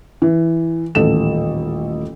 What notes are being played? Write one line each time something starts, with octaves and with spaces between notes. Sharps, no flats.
E3
D#1 A1 A4 E7